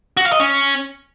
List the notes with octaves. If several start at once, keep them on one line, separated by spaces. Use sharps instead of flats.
F#4
F5
D#5
C#4